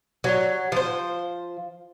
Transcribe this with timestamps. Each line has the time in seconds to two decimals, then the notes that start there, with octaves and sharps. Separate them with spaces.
0.24 F#3
0.72 F3 C5